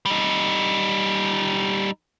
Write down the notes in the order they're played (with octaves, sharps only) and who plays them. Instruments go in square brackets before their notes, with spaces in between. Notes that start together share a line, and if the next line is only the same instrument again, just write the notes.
[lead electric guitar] G3 D#4